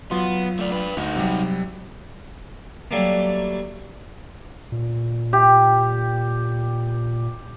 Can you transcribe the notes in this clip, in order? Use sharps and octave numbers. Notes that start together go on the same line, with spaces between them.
F#3 B3 F4 C6
A3 D5
D4 B4
D2 D#4 F#4
C3 F#3 G3
F#3 G3 A3 A#3
A#2
G4